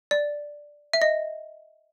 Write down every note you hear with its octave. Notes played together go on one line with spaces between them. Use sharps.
D5
E5
D#5